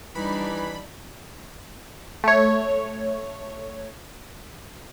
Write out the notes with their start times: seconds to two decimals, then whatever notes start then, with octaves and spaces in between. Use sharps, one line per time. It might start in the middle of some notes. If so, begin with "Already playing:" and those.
0.15 E3 G3 D4 D#4 B5
2.24 A3 C#5